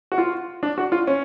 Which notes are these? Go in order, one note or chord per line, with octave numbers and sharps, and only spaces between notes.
F#4
F4
D4
F#4
F4
C#4